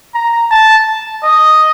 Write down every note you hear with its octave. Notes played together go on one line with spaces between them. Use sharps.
A#5
A5
D#5